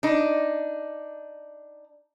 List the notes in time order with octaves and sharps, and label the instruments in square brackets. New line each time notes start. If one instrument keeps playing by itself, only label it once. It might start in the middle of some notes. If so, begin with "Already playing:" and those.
[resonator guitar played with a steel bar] D4 D#4